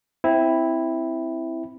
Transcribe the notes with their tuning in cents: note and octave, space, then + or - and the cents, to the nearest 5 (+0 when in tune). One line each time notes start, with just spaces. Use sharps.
C4 +0 E4 -5